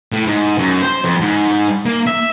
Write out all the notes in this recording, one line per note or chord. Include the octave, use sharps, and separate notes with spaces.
A2
G#2
F#2
C5
F2
G#2
A#3
E5